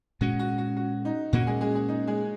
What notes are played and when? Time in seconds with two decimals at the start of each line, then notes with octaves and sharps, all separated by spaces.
0.21 A#2 G#3 C#4 F#4
0.39 F#4
0.58 F#4
0.77 F#4
1.05 D#4
1.33 A#2 A#3 C#4 F#4
1.47 G#3 G#4
1.61 G#3 G#4
1.75 G#3 G#4
1.89 D#4
2.07 G#3 G#4